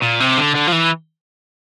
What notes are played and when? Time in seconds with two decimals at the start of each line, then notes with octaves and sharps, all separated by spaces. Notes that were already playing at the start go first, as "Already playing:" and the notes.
0.02 A#2
0.20 C3
0.37 D3
0.55 D3
0.68 F3
0.72 E3